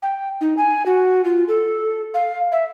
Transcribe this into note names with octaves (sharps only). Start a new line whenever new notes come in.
G5
D#4
G#5
F#4
F4
A4
F5
E5